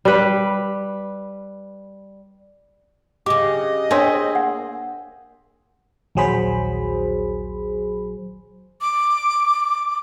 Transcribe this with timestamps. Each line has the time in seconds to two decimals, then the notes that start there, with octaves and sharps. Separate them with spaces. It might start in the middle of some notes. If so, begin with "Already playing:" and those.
0.05 G3 B4
3.26 C#3 G4 D#5 D6
3.91 A#3 D4 G#4 C5 C#5 E5 G5
4.35 F#5
6.15 A#1 D#2 F#3 G#4 C5 B5
8.81 D6